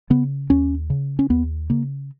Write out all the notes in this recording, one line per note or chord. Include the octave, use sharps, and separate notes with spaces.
C#3 B3
D#2 C#4
C#3
C#4
D#2 B3
C#3 A#3